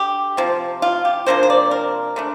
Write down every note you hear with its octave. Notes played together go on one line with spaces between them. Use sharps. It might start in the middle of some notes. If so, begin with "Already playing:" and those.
Already playing: D3 G4
C3 F3 C4
F4
G4
C3 F3 A#3 D4 C5
C5
D5
A#4
D3 A3 D4